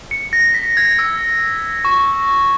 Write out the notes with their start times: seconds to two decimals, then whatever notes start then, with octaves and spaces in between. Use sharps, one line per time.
0.11 C#7
0.33 A#6
0.54 B6
0.77 G#6
0.99 E6
1.85 C#6